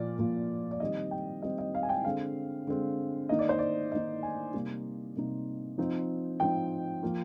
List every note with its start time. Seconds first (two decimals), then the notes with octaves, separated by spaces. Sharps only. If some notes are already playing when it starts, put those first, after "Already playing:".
Already playing: A#2 F3 A#3 F4 D5
0.19 A#2 F3 A#3 F4
0.71 D5
0.80 D#3 G3 C4 D#5
1.11 G5
1.42 D#3 G3 C4 D#5
1.58 D#5
1.75 F5
1.83 G#5
1.89 G5
2.04 D3 G#3 C4 F5
2.67 D3 G#3 C4
3.29 D#3 A#3 D#4 D#5
3.39 D5
3.49 C5
3.58 D5
3.92 D#3 A#3 D#4 D#5
4.23 G#5
4.54 C3 G3 A#3 D#4
5.16 C3 G3 A#3 D#4
5.78 F3 C4 D#4
6.40 F3 C4 D#4 G5
7.03 F3 A#3 F4